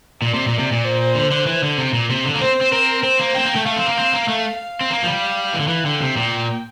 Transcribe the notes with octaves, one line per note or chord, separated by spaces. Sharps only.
A#2 D5
C3
A#2
C3
A#2
C5
D3
D3
E3
D3
C3
A#2
C3
D3
A#3
C4 C5
C4
C4 A#4
C4 C5
A#3
C4 G5
A#3
A3
A3 F5
C4
A#3
C4
A#3
A3
F5
C4
A#3
F3
G3
E3
D3
E3
D3 G5
C3
A#2